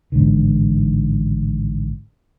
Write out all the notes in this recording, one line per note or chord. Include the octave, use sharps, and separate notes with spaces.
A1 G#2 D3 D#3